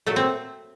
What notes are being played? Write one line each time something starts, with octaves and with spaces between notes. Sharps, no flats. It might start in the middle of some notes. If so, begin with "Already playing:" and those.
A#2 F#3 A3
C4